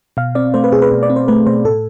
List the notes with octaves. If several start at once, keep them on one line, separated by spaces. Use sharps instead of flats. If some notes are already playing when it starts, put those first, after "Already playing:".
B2 F5
C4 D5
A3 C5
B4
B2 G#4
B4
B2
D5
C4
C5
A3 B4
B2 C5
A2 A4